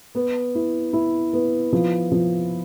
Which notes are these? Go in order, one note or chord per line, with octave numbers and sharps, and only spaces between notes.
B3
E4
E4
B3
F3
F3